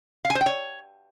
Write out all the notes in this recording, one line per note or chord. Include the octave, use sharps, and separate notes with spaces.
F5
G#5
C5
G5
C#5